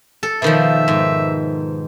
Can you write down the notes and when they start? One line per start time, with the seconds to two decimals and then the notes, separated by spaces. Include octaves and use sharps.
0.23 A4
0.42 B2 D#3 F3 E5
0.88 G#2